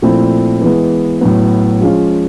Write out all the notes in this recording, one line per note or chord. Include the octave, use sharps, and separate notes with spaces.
A#2 F3 A3 C4 E4
E3 G#3 B3
A2 F#3 B3
F3 G#3 C#4 F4